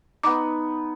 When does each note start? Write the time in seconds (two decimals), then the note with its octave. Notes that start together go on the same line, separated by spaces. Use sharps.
0.23 B3 D#4 D6